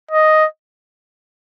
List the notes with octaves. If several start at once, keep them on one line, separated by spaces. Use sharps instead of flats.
D#5